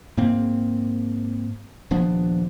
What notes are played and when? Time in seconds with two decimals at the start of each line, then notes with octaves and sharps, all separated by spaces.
0.17 G#2 A#3 C4
1.91 D#1 F3 B3 D4